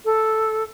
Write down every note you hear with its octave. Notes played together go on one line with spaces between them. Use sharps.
A4